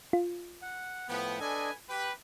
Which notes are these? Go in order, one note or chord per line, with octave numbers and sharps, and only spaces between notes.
F4
F#5
A2 F3 B3 G5
D4 A4 B4 D#5 G#5
G4 B4 G5